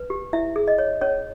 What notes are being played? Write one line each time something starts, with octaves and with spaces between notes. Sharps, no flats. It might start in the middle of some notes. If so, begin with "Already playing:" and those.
Already playing: B4
G4
E4 E5
G#4
D#5
C#5
C#4 C#5